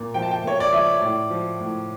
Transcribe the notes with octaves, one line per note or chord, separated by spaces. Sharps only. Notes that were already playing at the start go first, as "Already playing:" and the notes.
Already playing: A#2
F3 G5
A5
G5
A#2 C#5
D5
F3 E5
A2 D5
F3
A2